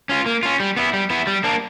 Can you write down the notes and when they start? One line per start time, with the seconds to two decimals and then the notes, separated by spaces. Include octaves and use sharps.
0.09 C#4 F4
0.26 A#3
0.43 C#4 F4
0.60 G3
0.77 B3 E4
0.93 G3
1.10 B3 E4
1.27 G3
1.44 A#3 D4